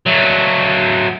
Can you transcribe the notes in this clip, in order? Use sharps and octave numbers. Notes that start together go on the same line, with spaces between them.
F#3 A3